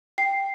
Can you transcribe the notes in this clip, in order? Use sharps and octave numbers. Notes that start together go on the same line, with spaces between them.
G5 C7